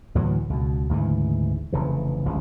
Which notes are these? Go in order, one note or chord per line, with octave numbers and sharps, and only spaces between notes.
D2 A2 E3 F#3
C#2 B2
D2 G#2 C#3 E3
F1 C#3 E3
G1 C#2 G#2